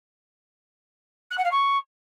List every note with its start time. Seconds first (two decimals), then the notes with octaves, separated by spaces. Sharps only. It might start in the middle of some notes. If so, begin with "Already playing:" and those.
1.31 F#6
1.38 F#5
1.45 F5
1.52 C#6